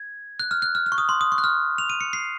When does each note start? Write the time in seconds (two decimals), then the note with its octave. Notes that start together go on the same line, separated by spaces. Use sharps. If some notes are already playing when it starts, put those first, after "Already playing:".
Already playing: G#6
0.40 F#6
0.51 F6
0.62 F#6
0.75 F6
0.86 F6
0.92 C#6
0.98 D#6
1.09 C6
1.21 D#6
1.32 C#6
1.38 F#6
1.44 F6
1.78 F7
1.90 D#7
2.01 C#7
2.13 C7